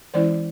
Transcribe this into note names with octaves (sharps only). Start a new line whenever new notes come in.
E3 G#3 C#4 E4 C5 D5